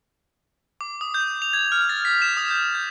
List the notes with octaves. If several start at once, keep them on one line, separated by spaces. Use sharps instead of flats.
D6
D#6
G6
F7
G#6
F6
A6
B6
E7
D#6
G6
G6